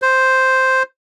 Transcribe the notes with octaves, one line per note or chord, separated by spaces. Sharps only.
C5